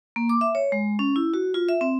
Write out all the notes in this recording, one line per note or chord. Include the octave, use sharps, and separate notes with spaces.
A#3
D6
E5
C#5
G#3
C#4
E4
F#4
F4
E5
C4